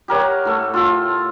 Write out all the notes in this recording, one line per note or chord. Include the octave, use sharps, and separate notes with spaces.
G4 A#4 C#5 F#5
A2 A3
F4 A4